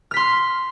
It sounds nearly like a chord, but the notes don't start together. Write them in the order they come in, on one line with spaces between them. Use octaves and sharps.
F6 B6 C6